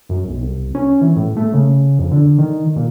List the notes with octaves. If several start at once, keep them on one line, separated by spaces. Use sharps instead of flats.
F#2
B1
C2
C#4
E3
A2
A3
C#3
F2
D3
D#3
A#2